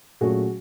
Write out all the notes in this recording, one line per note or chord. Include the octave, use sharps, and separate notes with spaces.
A#2 F#3 A3 C#4 F#4 G#4